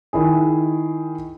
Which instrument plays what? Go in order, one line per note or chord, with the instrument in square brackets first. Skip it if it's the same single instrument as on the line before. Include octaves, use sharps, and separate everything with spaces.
[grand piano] D#3 E4 G#4